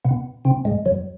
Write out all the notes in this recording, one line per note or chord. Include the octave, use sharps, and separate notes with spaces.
B2 B3
C3 C4
G#2 G#3
F#2 F#3